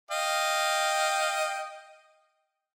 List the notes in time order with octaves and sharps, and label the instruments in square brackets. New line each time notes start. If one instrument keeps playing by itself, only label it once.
[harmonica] D#5 F5 G5